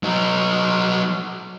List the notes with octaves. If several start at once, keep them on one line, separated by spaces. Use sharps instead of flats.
F#3 D#4